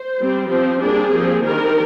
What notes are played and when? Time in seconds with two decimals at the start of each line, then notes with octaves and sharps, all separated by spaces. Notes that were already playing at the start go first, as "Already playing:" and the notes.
Already playing: C5
0.20 G3 C4
0.51 F3 C4 C5
0.82 G3 A#3 D4 G#4
1.13 F3 C4
1.45 D#3 G3 D4 A#4